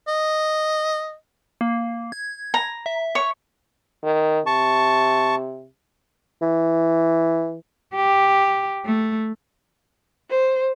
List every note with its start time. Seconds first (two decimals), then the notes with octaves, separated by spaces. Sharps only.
0.08 D#5
1.61 A#3
2.12 G#6
2.54 A#5
2.86 E5
3.15 C#5
4.04 D#3
4.46 C3 A5 C#6
6.42 E3
7.95 G4
8.86 A3
10.30 C5